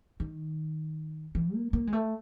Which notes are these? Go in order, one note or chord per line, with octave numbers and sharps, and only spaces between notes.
D#3
E3
A#3
A#3
G#3
A3